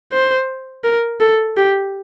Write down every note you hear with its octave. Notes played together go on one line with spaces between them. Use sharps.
C5
A#4
A4
G4